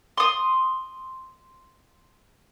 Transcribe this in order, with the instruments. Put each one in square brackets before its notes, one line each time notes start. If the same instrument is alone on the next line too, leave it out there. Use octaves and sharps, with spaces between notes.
[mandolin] C6 D#6